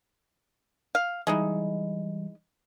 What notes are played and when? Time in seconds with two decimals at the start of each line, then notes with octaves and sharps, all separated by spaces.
0.95 F5
1.27 E3 G3 G#3 D#4 E4